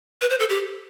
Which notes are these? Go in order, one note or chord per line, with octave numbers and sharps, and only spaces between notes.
B4
C5
A4
G4